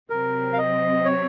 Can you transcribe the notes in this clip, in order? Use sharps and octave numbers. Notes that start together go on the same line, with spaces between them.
C3 F#3 C4 A#4
F5
D#5
C#5